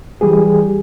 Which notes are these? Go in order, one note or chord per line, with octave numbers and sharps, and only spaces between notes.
E3 G3 G4 G#4